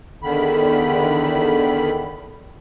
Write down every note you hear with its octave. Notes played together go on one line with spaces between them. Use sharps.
E2 D3 D#3 B5